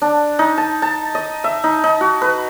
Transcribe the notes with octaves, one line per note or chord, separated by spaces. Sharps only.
D4
D#4
A5
A5
D#5
E5
D#4
D#4
F#4
B4